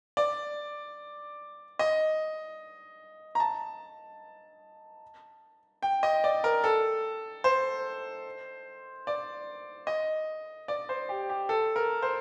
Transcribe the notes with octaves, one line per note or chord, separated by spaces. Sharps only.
D5
D#5
A#5
A5
G5
D#5
D5
A#4
A4
C5
D5
D#5
D5
C5
G4
G4
A4
A#4
C5